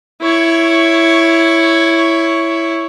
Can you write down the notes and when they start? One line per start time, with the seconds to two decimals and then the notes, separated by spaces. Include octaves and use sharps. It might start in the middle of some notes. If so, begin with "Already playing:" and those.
0.21 E4 C#5